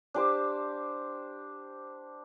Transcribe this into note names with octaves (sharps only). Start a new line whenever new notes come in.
D4 G4 C5